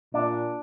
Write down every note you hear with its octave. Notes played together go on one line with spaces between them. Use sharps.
A#2 D4